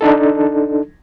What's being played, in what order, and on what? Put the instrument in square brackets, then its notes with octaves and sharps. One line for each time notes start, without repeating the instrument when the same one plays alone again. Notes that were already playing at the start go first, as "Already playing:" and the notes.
[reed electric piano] D4 D#4 A4